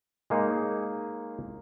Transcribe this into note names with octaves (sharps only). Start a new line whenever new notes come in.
G#3 A#3 D#4 G#4 C#5